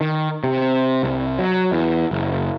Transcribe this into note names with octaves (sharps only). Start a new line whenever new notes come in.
D#3
C3
C2
F#3
E2
F#1